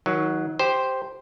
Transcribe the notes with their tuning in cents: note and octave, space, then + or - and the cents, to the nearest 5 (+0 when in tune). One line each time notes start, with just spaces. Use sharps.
D#3 +30 F#3 +0
G4 +0 C5 +0